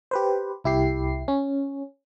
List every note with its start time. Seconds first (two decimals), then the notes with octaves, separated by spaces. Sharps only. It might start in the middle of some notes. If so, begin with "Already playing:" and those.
0.11 G4 B4 C5
0.64 C2 E4 G4 C7
1.28 C#4